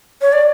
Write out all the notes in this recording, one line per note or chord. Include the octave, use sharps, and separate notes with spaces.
C#5
D5